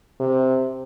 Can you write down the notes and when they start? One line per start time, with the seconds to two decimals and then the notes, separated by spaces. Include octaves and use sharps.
0.20 C3